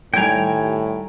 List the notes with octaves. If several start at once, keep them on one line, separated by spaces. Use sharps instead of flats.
A2 D#3 G3 G5 G#5 A#5 G6